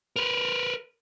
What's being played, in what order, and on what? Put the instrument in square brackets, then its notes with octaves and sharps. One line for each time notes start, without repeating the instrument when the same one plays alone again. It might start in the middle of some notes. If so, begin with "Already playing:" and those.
[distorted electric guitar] A#4 B4